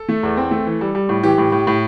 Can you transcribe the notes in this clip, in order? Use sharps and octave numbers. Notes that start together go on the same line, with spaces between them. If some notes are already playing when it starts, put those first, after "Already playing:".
Already playing: A4
A3
E2
C4
A3
E3
G3
G3
A2
E3 G4
A2
A2
A2